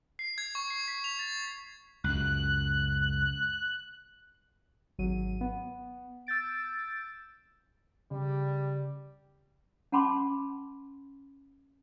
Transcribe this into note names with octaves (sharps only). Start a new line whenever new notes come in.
C7
G#6
C#6
C7
B6
F7
A6
C#2 F#2 F#6
G#1 F#3 D#7
B3
E6 G6 A6 D7
C#3 G3
C#4 F#5 A5 B5 C6 D6